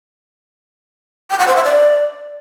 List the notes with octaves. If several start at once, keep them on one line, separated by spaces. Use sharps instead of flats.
G5
F#5
C5
E5
D5